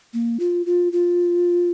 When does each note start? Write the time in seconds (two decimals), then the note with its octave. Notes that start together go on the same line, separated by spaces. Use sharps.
0.13 A#3
0.40 F4
0.66 F4
0.92 F4